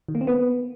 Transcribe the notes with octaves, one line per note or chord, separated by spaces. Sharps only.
D#3
A#3
C4
B3